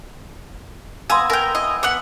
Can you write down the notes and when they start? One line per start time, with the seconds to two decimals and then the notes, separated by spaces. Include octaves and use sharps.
1.10 B3 F5 G#5 A#5 C6 D#6 E6
1.30 A#4 D5 G5 G#5 B5
1.55 E4 D#5
1.83 B3 F#5 G5 D6